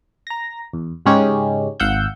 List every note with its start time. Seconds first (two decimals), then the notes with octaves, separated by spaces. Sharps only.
0.27 A#5 A#6
0.73 E2
1.06 G#2 C#3 G#3 C#4 D#4 G4
1.80 G#1 F5 F#5 E6 G6